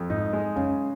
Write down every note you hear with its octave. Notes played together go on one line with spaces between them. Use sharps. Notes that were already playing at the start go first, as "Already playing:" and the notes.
Already playing: F2
G#2 D#4
G#3
F#2 C#3